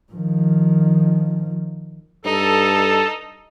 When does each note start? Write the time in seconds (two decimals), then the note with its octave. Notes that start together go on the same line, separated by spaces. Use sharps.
0.13 D#3 F3
2.25 G2 D#4 A4